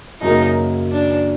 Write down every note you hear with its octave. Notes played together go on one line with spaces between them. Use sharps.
F#2 C#3 F#3 A#3 D#4
D4